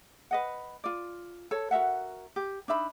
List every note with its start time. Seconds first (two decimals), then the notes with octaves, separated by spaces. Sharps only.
0.31 B4 D#5 F#5
0.84 F4 D5
1.51 A4 C#5
1.71 F#4 A#4 E5 F#5
2.36 G4
2.68 D4 D#4 E5 B5